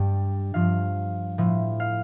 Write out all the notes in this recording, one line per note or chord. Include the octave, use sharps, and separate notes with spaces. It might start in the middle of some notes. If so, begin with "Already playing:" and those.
Already playing: G2 G3 G5
G2 F3 F5
A2 F3
F5